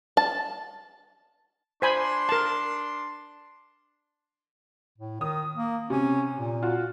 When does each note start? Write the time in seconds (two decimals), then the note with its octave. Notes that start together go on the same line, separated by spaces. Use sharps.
0.17 A5
1.82 D4 C5 G#5 B5 C6
2.29 A#4 A5
4.98 A2
5.21 D#3 D#6
5.55 A#3
5.90 C3 C#4
6.37 A#2
6.62 F4 F#4